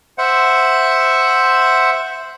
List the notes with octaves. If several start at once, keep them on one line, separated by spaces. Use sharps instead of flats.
C5 E5 F#5